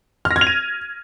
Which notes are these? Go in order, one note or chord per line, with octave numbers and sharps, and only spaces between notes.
F6
A#6
G#6
F7
D#7